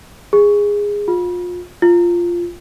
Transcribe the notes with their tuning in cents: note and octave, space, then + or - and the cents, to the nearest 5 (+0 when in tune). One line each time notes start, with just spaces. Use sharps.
G#4 -15
F4 +30
F4 -5